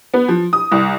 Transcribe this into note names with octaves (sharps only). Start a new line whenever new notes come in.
B3
F3
D#6
C2